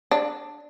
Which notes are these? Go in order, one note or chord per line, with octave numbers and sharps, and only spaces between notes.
D4